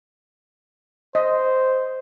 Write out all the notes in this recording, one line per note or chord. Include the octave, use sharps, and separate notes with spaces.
C5 D#5